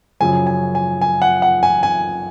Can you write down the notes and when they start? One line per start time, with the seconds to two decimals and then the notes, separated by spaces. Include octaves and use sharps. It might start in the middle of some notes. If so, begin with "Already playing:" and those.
0.20 F#2 C#3 F3 G#5
0.47 G#5
0.75 G#5
1.01 G#5
1.22 F#5
1.42 F#5
1.63 G#5
1.83 G#5